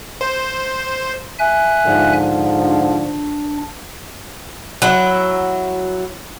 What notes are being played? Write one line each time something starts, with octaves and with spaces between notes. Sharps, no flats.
C5
E5 G#5 F#6
G#2 D3 F3
D4
F#3 E4